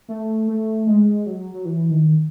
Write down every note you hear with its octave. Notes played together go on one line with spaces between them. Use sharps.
A3
A3
G#3
F#3
F#3
E3
D#3